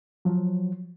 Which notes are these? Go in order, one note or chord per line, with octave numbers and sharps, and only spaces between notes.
F3 F#3